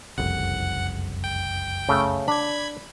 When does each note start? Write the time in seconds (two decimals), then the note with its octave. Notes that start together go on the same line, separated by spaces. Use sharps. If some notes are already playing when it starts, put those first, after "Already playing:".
0.18 F#1 C2 F2 F#5
1.24 G5
1.89 C#3 A3
2.28 D4 B5 G#6